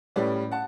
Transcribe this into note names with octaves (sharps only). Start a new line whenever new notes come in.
A2 G3 C#4 B4 D5
F#5 A5